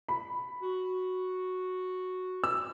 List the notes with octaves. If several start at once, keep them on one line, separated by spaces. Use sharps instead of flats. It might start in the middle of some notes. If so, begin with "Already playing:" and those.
B5
F#4
E6